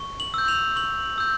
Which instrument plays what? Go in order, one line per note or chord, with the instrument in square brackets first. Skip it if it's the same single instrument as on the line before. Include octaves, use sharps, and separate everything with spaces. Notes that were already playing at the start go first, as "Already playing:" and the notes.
Already playing: [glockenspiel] C#6
F#7
E6 G6
F7
C#6 F#7
E6 G6